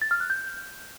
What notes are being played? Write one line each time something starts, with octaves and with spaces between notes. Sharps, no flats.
A6
F6
F#6
G6